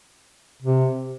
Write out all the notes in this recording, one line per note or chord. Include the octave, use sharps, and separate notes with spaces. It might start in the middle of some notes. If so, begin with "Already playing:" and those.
C3